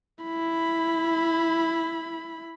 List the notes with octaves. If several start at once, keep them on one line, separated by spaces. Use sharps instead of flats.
E4 B5